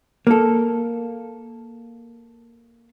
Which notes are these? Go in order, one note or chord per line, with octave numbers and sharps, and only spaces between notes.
A#3 A4